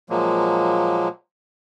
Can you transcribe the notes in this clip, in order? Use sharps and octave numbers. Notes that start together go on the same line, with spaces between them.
A#2 F3 F#3 G#3 A#3